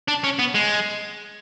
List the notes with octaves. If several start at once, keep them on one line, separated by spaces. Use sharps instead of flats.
D4
C#4
B3
G#3